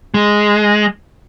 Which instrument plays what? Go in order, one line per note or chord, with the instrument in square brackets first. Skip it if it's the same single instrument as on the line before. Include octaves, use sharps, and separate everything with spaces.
[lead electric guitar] G#3